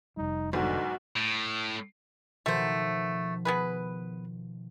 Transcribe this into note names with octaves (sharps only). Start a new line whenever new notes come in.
F1 G3 D#4
B1 G#2 D3 F#4
A2
B2 D#3 F3 A3 C5
B3 G#4 B4